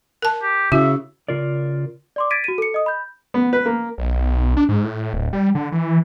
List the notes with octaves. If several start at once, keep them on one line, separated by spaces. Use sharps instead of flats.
A#4 A5
G4
C#3 E4 F#4 E5
C#3 F4 A#4 D5
D5 C6 D6
G#6 A6 B6 D7 D#7
F#4 D#7
A4 C#7
D#5 D#6
B5 G6
B3
B4
A#3
B1
D4
G#2
A2
D1
G3
D3
E3